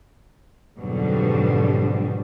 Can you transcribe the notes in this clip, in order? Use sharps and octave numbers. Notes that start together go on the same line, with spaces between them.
F2 G#2 B2 D3 F#3 G3